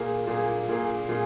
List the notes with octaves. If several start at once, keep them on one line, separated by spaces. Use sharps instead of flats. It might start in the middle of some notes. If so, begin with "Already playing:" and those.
Already playing: A#2 A#3 G#4
A#2 A#3 G#4
A#2 A#3 G#4
A#2 A#3 G#4